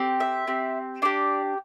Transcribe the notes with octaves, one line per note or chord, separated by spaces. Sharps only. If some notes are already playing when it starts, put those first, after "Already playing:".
Already playing: C4 G4
E5
C4 G4
D4 G4 D5